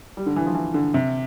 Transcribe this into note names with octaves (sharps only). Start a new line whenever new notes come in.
G3
D3
E3
F3
E3
D3
C3